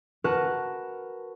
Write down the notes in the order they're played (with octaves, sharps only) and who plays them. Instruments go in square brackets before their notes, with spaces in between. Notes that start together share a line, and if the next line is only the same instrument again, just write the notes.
[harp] F#4 A#4 B4 A5 F#6